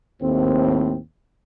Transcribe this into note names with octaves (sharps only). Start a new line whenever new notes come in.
D#2 A2 C4